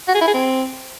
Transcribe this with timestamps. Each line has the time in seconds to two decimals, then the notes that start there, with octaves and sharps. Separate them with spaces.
0.08 F#4
0.15 G#4
0.21 E4
0.28 G#4
0.34 C4